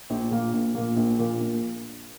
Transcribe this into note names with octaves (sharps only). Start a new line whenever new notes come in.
A#1
A#2 A#3
A#1
A#2 A#3
A#1
A#2 A#3
A#1